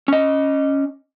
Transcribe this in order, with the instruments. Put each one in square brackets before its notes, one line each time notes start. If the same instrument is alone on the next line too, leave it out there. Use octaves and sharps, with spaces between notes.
[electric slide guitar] C#4 D#5